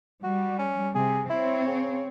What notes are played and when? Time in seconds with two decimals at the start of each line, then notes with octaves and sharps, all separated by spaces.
0.24 G3 F#4
0.59 C#4
0.95 C3 G#4
1.30 C4 E4 C#5
1.67 C#3